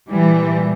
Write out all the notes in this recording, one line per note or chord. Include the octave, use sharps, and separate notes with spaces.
A#2 E3 G3